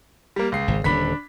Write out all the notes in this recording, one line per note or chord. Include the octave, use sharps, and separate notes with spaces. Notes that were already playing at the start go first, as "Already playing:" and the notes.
G3 A#3
C#2 C7
G#1
D#1 D3 D4 B5 B6